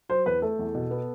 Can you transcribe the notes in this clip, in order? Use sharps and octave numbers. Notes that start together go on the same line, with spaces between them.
F#3 C5
E2 B4
A3 A4
E2
B2
B3